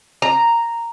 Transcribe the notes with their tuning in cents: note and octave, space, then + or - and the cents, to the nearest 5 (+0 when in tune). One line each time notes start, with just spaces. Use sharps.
A#5 -5